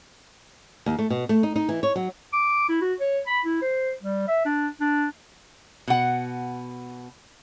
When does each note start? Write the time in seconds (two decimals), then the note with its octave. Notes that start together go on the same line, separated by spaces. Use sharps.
0.86 D#2
0.99 A3
1.10 B2
1.29 A3
1.43 D#4
1.56 D#4
1.69 E3
1.83 C#5
1.96 F#3
2.33 D6
2.69 E4
2.81 F#4
3.00 C#5
3.27 B5
3.45 E4
3.62 C5
4.02 G3
4.27 E5
4.45 D4
4.80 D4
5.88 B2 F#5